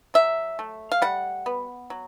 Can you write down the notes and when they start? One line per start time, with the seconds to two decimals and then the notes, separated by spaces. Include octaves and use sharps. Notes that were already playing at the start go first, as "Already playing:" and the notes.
0.14 F#3 E5
0.59 A3
0.92 F5
1.02 G3 F#5
1.46 B3
1.90 F#3